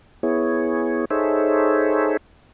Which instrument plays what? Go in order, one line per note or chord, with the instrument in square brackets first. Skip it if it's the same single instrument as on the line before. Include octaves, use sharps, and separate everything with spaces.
[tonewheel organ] B3 E4 G#4 C#5
D#4 G#4 A4 C5 C#5 E5